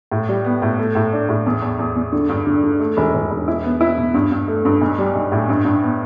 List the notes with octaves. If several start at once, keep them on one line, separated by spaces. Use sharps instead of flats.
A2
G3
B3
A2
A3
A2
D4
A2
E2
E2
E2
E2
D3
G2
D3
D3
A3
E1
E1
E1
E4
B3
E4
B2
G2
G2
A3
G2
B1
G3
B1
A2
G2
G2
B3